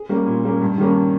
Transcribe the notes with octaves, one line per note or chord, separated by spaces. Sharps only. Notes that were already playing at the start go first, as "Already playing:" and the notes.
Already playing: G#4
G3 A#3 C#4
A#2
G3 A#3 C#4
G2
D#3 G3 A#3 C#4